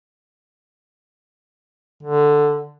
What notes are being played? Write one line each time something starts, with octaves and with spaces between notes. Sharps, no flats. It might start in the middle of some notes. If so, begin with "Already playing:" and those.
D3